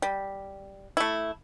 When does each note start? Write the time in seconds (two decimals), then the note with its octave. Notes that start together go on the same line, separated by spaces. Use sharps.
0.02 G3
0.97 A3 E4